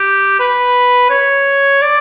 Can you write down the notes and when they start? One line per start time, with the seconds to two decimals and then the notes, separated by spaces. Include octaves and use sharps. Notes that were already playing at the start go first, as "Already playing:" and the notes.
Already playing: G4
0.40 B4
1.10 C#5
1.82 D5